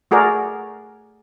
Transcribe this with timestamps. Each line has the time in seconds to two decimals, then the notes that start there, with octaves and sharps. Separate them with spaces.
0.11 A3 F#4 G#4 A#4 D5